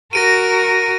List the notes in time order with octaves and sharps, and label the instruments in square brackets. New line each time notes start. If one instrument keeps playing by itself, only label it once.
[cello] F#4 A#4 [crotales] A#6 D7 D#7